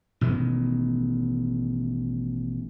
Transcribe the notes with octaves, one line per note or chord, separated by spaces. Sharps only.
A1 B2 D#3 G#3